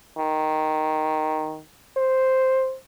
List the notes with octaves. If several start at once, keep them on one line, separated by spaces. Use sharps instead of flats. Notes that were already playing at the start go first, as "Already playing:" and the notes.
D#3
C5